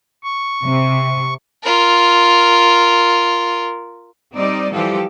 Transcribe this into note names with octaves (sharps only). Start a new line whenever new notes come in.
C#6
C3
F4 A#4
G3 C4 D#4 D5 D#5
E3 F3 G3 G4 A4